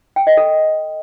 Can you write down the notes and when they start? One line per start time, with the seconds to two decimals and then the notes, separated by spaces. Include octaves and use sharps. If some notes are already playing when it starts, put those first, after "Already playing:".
0.16 G5
0.27 D#5
0.37 A4